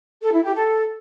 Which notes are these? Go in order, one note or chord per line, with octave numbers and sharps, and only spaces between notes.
A4
E4
G4
A4